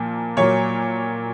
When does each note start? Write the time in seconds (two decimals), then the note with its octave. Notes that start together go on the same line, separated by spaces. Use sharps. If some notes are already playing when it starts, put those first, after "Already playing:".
Already playing: A#2 F3 A#3
0.37 A#2 F#3 A#3 C#5